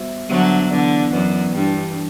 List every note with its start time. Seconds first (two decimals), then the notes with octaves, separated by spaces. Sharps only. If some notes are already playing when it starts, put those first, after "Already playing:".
Already playing: G3 B3 F#4 C5 E5
0.29 D3 F#3 G3 B3 F#4 C5 E5
0.71 D3 E3 B3 E4 B4 D5
1.13 F#2 E3 B3 E4 B4 D5
1.55 G2 E3 G3 D4